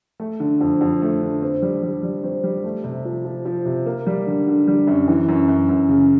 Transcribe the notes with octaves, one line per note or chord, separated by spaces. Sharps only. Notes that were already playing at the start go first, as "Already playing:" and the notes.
A3
D3
F2
F2
A3
D3
C4
G3
G3
G3
C4
G3
A3
C3
F3
F3
F3
C3
A#3
G3
D3
D3
G3
F#2
E3
F#2
F#2
F#2
C#3